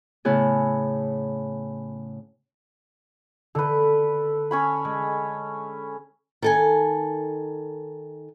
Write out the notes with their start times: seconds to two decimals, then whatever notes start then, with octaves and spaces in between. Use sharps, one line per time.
0.25 A2 C#3 B3 E4 G#4
3.55 D3 A4 B4
4.51 C#4 C#5 B5
4.85 G#3
6.42 D#3 A4 G#5